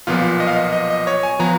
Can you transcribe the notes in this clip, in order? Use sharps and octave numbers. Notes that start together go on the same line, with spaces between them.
B1 A#2 F3 B3 F4
D#5
F5
D#5
D#5
D#5
C#5
G#5
F3 B3 A#5